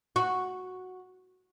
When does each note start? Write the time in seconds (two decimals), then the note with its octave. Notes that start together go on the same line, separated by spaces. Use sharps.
0.16 F#4